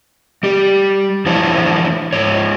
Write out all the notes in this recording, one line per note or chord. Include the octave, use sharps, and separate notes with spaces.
G3 G4
E3 F3 D4 E4 C5 C#5
G#2 C#5